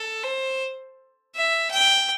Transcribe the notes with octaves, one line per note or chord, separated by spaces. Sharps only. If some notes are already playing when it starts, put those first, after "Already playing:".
Already playing: A4
C5
E5
G5